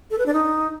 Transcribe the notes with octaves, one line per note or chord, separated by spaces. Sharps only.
A4
B4
D4
D#4